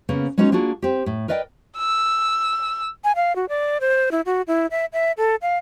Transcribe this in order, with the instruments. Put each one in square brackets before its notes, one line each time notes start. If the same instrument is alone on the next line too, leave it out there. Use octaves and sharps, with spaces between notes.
[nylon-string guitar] C#3 A#3 B3
G#3 B3 C#4 D#4 F#4 G#4
A#3 D4 F4 F#4 G#4
C4 G4
A2
A#4 B4 D5 D#5 F5 G5
[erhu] E6
[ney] G#5
F5
F#4
D5
C5
E4
F#4
E4
E5
E5
A4
F5